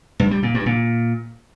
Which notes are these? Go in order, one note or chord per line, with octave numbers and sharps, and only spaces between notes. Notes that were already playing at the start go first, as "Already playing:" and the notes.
G2
G3
A#2
G2
A#2